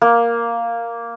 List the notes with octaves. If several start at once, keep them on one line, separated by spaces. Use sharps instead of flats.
A#3